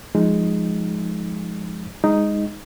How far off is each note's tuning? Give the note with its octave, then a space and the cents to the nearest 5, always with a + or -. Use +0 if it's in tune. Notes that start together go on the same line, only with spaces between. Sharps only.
F3 +0 G#3 +0 D#4 +0
G#3 -15 D#4 +0